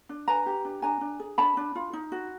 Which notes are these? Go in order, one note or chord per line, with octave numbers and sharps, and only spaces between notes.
D4
B4 G#5 A#5
G4
D4
D4 G#5 A#5
D4
G#4
D4 A5 B5
D4
F4
D#4
F#4